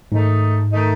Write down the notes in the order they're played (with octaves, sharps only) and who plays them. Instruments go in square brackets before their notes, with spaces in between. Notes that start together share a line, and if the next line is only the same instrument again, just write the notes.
[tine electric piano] G#2 [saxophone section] D#3 A3 D#4
[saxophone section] D#3 A3 D#4